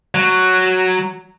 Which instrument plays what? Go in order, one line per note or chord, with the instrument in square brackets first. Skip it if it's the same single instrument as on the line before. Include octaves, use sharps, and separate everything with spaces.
[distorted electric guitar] F#3